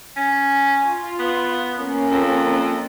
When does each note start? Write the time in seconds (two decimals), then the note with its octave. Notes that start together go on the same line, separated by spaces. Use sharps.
0.16 C#4
0.85 F4
1.19 B3
1.78 A#3 C#4 A#4
2.10 F2